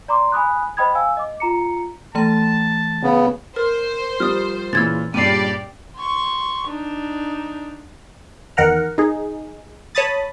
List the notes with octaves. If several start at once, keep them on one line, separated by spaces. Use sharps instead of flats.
D5 A#5 C6 D6
G#5 B5 D#6 F#6
C5 D#5 G5 B5 D#6 G#6
F5 G#5 E6
D#5 D6
F4 A#5 C#7
E3 A3 A5 A#5
C#3 B3
A#4 C5
F3 G3 D#6 F6
A#2 C#3 E3 E6 G#6 A6
G2 A#2 C#3 G4 D5 C7 D#7
C6 C#6
D4 D#4
E2 D#3 A#4 F#5 A#5 F6
D#4 G#4
C#5 A5 B5 D#6 A6